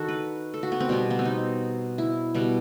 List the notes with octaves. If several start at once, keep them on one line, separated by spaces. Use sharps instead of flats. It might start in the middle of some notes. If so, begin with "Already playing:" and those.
Already playing: D#3 F#4 A4
B4
A4
F#4
B3
C4
B2 G3 B3
B3
C4
D#4
E4
B2 G3 B3